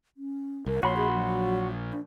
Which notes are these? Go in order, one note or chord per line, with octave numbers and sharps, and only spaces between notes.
C#4
C2 A#4
A#1 F#4 C#5 B5 C6
G#4
F#3
D4